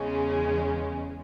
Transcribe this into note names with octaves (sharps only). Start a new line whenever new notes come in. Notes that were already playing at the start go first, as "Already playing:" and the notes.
Already playing: E2 C#3 G#3 C#4